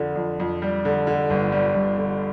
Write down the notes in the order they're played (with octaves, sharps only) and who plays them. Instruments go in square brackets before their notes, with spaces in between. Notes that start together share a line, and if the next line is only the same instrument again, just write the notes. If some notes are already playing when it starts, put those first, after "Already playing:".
Already playing: [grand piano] F2 D3
F2
F2
G3
D3
D3
G1
G3
G1
D3